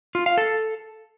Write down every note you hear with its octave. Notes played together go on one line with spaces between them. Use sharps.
F4
F5
A4